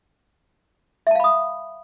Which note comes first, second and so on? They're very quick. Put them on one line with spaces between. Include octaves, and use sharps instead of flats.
E5 A5 F5 B5 D#6